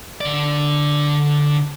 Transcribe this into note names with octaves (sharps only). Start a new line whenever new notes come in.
D3 D5